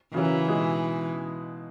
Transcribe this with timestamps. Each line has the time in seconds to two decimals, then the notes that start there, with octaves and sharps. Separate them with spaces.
0.14 C#3 E3 F#3 C#4 F#4 A#4
0.48 B2 G#3 D#4 G#4